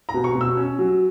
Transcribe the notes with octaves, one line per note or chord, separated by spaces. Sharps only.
A#5
B2
C#6
B2
E6
C#4
F#3